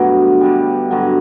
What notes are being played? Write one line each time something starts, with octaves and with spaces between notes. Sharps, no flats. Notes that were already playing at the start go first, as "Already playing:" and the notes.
Already playing: G2 B2 D3 F#3 A3 B3
G2 D3 G3
G2 D3 F#3